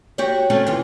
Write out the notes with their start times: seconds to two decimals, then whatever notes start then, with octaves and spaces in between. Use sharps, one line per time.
0.18 F#4 G4 C#5
0.50 A3 C4 C#4
0.67 E3 F4